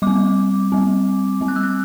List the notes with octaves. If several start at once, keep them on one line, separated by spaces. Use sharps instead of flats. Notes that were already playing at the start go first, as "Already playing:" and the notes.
G3 C4 D6
G3 C4
G3 C4
F#6
E6
F#6